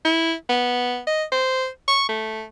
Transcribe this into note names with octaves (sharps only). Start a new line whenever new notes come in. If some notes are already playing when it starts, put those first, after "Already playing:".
E4
B3
D#5
C5
C#6
A3